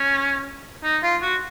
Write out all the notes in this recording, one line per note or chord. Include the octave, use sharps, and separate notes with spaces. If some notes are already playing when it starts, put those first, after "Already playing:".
Already playing: C#4
D#4
F4
F#4